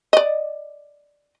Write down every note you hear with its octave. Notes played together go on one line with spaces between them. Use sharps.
D5 D#5